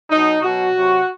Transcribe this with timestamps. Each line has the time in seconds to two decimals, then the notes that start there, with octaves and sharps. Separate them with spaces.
0.10 B2 F#3 D#4
0.42 B2 F#3 F#4
0.73 C3 F#3